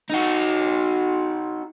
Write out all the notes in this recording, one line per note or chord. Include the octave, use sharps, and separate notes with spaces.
D#4 F#4